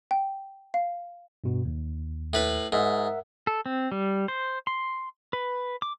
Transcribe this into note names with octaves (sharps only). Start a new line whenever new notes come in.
G5
F5
G2 B2
D#2
A2 B4 B5
G#2 A#4 E5 F#5
A4
C4
G3
C5
C6
B4
D6